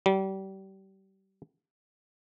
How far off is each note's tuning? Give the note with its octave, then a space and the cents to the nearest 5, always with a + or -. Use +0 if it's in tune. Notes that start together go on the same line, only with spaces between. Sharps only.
G3 -30